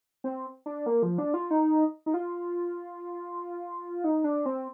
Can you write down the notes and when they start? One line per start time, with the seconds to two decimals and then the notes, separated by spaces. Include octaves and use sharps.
0.24 C4
0.66 D4
0.86 A#3
1.03 F3
1.18 D4
1.34 F4
1.51 D#4
2.06 D#4
2.14 F4
4.04 D#4
4.24 D4
4.46 C4